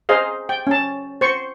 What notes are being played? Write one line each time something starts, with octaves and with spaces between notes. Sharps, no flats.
G#4 C5 D#5 F5
G5
C#4 A5
C5 C#6